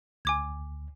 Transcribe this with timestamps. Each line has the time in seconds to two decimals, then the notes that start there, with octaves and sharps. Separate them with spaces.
0.25 D2 G#5 D6 G#6